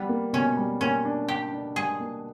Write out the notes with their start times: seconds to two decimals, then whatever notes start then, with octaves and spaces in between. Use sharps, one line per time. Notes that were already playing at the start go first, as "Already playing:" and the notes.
Already playing: G3 B3
0.09 A#3
0.33 B2 C#4
0.57 G3
0.81 A#3 C#4
1.05 D4
1.28 D4 G4
1.53 D4
1.76 G3 G#4
2.00 A#3